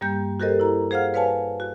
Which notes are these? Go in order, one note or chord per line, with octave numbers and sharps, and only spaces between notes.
G2 G3 A#3 G6
F#4 G4 A4 A#4 C5 D#5
E4 A#5
G#4 C5 F5 F#5 F6
B4 C#5 F5 G#5 A5
F#4